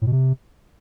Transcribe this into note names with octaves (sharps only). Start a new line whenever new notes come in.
A2
B2
C3